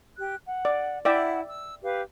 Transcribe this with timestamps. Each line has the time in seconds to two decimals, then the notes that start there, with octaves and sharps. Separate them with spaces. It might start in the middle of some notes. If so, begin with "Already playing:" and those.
0.16 G4 F#6
0.44 F#5
0.65 D5
1.05 E4 D5 E5 F#5 G5
1.48 E6
1.83 G4 B4 F5